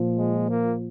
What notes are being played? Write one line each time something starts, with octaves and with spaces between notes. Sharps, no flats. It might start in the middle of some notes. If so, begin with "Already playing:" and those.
Already playing: A#2 F3
G#3
A#3